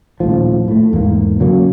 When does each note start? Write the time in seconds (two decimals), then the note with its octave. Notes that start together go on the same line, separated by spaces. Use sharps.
0.20 D#1 A2 F3
0.68 A2 A3
0.93 E2 G#2 A#3
1.40 C#3 F#3 A#3 C#4